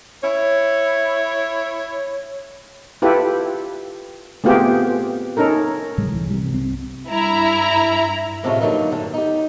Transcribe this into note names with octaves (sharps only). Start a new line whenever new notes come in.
E4 C#5
E4 F4 G4 A4 B4
A3 B3 C4 F4 G4 G#4
C#4 D#4 A4 A#4
G#2 C3 F#3 G#3
C2 G2 E3
C3 G3
C2 C4
G2 E4 A#5
A2 C3 G#3 A3 C#4 F4
G2 D3 F#3 A#3 D#4
F#2 D3
D#4 G4